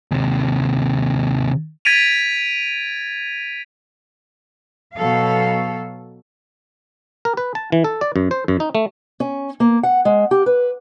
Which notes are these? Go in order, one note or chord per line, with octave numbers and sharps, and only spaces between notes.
D#2 C3
G#6 A6 B6 D7 D#7 F7
B2 F#3 A4 F5
A#4
B4
A5
E3
A4
D5
F#2
C5
F#2
D#4
A3
C#4
A#3
F#5
G#3
G4
B4